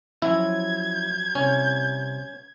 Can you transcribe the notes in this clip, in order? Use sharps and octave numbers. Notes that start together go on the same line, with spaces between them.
F3 F#3 C#4 E4 G#6
C2 C3 C#4